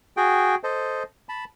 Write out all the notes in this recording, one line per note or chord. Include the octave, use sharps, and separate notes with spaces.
F#4 G#4 G5
A4 C5 D#5
A5 B5